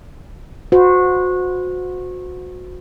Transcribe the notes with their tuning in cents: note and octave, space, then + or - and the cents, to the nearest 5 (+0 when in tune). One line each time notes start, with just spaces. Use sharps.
F#4 -25 C5 -30